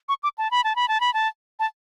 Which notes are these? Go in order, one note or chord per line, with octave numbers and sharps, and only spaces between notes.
C#6
D6
A5
B5
A5
B5
A5
B5
A5
A5